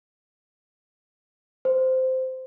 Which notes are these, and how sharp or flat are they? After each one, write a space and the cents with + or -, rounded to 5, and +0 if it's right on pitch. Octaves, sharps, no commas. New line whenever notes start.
C5 -10